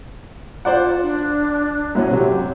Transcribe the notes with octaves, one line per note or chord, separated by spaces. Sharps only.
F4 C5 D5 F#5
D4
F#2 A2 C#4
C3 F#3 G4